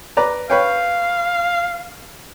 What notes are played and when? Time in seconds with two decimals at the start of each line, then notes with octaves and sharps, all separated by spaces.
0.17 B4 D5 A#5
0.50 B4 C#5 F5 G5